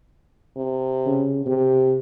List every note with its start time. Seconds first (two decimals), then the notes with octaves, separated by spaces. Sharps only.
0.57 C3
1.06 C#3
1.46 C3 G4